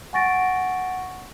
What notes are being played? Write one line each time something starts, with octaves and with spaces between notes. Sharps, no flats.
F#5 G#5 C#6 A6 A#6 D7